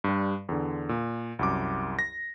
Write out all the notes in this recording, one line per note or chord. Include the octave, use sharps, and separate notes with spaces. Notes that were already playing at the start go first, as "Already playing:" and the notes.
G2 G3
E2 D3
A#2
C2 F#2 D6
A#6